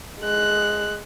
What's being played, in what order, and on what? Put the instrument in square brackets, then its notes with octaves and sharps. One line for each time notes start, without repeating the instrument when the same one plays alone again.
[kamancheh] G#3 F#6